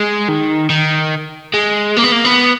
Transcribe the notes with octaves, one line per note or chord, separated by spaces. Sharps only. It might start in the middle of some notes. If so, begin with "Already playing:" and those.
Already playing: G#3
D#3
D#3
G#3
A#3
B3
A#3
B3